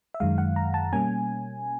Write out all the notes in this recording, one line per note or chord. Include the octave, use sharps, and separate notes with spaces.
E5
F#2 D#3 G#3 F5
F#5
A#5
A5
B2 G3 A#3 C#4 G#5